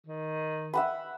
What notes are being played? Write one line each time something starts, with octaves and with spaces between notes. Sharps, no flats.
D#3
E5 F#5 B5